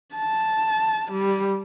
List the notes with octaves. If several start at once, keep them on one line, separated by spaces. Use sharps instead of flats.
A5
G3